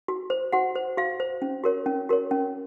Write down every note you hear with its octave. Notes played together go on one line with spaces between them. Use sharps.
F#4
C5
F#4 F#5
C5
F#4 F5
C5
C#4
F#4 A#4 C#5
C#4
F#4 A#4 C#5
C#4